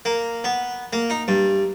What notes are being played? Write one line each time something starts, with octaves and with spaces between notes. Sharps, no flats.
A#3
B3
A#3
D#4
G2